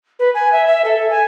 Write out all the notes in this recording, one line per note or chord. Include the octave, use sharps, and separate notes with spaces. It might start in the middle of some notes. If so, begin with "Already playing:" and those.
B4
G#5
E5
E5
A4
G#5